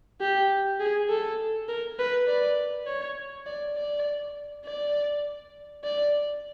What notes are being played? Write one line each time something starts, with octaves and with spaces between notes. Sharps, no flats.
G4
G#4
A4
A#4
B4
D5
C#5
D5
D5
D5
D5